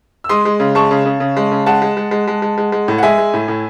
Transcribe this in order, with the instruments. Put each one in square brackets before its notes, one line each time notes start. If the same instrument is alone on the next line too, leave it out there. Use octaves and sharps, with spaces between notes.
[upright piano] E6
G#3 C6 D#6
G#3
C#3
G#3 A5 C#6
C#3
C#3
C#3
G#3
C#3
G#3 F#5 A5
G#3
G#3
G#3
G#3
G#3
G#3
G#3
A2
F#5
G#3 E5 G#5
G#3
A2
A2